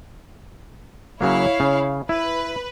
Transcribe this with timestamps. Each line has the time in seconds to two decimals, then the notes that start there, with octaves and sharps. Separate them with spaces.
1.21 C#3 F#3 A#3 E4 C#5 F5
1.60 C#3
2.09 E4 B4